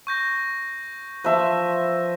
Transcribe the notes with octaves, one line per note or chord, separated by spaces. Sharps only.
C#6 G6 A#6
F3 B4 E5 A5 C6